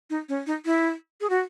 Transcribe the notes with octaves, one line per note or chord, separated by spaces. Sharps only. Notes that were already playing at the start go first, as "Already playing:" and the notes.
D#4
C#4
D#4
E4
G#4
F#4